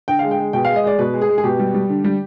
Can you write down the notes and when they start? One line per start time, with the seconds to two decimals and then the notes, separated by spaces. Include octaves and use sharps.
0.08 D3 G5
0.19 G#3 F5
0.31 G5
0.38 G#3
0.53 B2 G5
0.65 G#3 F5
0.76 D#5
0.84 G#3 D5
0.99 B2 B4
1.14 G#3
1.22 G#4
1.29 G#3
1.38 G#4
1.44 B2 G4
1.59 G3
1.74 G3
1.89 D3
2.04 G3